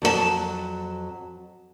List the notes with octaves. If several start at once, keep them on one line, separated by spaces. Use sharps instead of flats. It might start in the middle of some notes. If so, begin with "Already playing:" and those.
F2 F#3 A4 A5